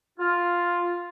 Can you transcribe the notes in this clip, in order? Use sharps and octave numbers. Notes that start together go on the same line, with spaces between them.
F4